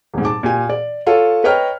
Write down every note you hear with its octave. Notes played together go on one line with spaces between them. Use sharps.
D#1 G#2
A5 D6
A#2 G4 G#5
D5
F4 A4 C#5
B4 C#5 D#5 G5 A#5 F6